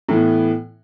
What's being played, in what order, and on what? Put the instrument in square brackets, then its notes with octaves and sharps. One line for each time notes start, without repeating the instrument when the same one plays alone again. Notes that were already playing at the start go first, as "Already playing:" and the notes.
[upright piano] A2 E3 B3